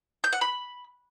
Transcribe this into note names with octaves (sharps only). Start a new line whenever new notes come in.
G6
F#5
B5